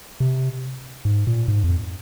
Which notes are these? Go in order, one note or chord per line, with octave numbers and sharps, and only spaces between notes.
C3
G#2
A#2
G#2
F2